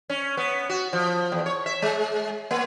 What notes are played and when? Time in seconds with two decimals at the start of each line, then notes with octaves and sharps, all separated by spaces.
0.10 C#4
0.37 B3
0.69 F#4
0.93 F3
1.32 E2
1.46 C#5
1.66 E5
1.82 G#3
2.51 A#3